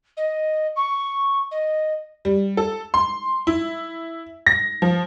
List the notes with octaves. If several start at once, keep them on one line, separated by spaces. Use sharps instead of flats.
D#5
C#6
D#5
G3
A4
C6
E4
A#6
F3